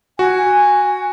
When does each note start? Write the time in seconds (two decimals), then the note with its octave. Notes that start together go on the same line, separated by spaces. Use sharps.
0.19 F#4 G#5